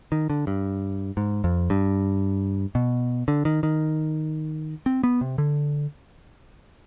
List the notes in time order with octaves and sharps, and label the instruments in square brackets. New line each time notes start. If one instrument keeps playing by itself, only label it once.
[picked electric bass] D#3
D3
G2
G#2
F2
G2
B2
D3
D#3
D#3
C4
B3
C3
D3